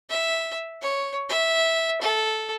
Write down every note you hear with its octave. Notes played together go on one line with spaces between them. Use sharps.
E5
C#5
E5
A4